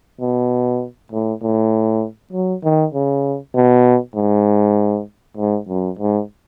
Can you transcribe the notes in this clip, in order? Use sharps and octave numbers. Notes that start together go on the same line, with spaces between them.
B2
A2
A2
F#3
D#3
C#3
B2
G#2
G#2
F#2
G#2